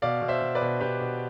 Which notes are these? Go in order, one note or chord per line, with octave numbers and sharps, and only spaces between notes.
B2 D5 F5
B2
C5 E5
B2
B4 D5
B2
B2 G4 B4
B2